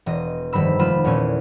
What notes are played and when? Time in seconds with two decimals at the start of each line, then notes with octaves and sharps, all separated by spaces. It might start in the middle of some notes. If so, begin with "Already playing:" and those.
0.06 E1 D#5
0.53 F1 G2 D#3 B5 E6
0.79 F1 G#3 F4 B5 E7
1.04 E2 A#2 A3 C#4